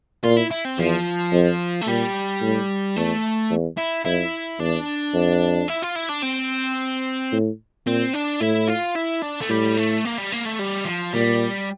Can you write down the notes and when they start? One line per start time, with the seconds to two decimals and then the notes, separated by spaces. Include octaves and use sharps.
0.24 A#2 F4
0.37 E4
0.51 E4
0.65 C4
0.78 E2 F3
1.33 F2
1.81 A3
1.87 A#2 G3
2.42 A2
2.96 E2 A3
3.50 E2
3.77 E4
4.05 F2 E4
4.60 E2 D4
5.14 F2
5.68 E4
5.82 F4
5.96 E4
6.09 D4
6.23 C4
7.32 A2
7.87 A#2 C4
8.14 D4
8.41 A2 E4
8.68 F4
8.96 E4
9.22 D4
9.41 A3
9.49 A2 G3
9.77 A3
10.05 A#3
10.18 G3
10.32 A#3
10.46 A3
10.59 G3
10.86 F3
11.13 A#2 G3